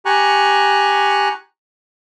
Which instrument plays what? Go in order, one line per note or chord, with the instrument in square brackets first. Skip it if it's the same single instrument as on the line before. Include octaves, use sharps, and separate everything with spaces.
[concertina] G4 G#5 A#5 C#6 F#6